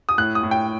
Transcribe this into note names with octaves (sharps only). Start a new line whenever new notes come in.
D#6
A2 F#6
D#6
A2
G5